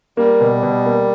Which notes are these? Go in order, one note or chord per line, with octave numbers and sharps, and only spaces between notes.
G3 A#3
B2
B2
A#3